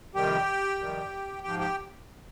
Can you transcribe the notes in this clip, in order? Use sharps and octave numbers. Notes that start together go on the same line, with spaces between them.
F2 C3 D#3 G3 G4 G5
F2 C3 D#3 G3
G#2 F3 G4 G5
G4 G5